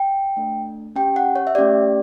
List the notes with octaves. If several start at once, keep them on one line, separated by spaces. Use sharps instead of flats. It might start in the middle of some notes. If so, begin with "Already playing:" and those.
Already playing: G5
A3 D4 A4
C#4 G4 G5
F#5
C#5
E5
A3 C#4 G4 D5